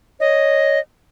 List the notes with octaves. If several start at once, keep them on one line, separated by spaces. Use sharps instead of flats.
C#5 D#5